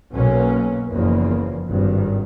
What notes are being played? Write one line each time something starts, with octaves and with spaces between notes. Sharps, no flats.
B1 B2 F#3 A#3 C#4
F#1 E2 C#3 F3 A#3
G#1 G2 D#3